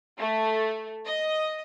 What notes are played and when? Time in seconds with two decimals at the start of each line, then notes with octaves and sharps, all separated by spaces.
0.18 A3
1.07 D#5